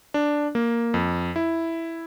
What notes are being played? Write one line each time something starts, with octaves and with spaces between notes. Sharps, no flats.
D4
A#3
F2
E4